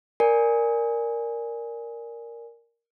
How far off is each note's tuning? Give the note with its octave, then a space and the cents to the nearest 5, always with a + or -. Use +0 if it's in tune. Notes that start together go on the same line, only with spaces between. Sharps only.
A#4 +0 D5 -5 G#5 +0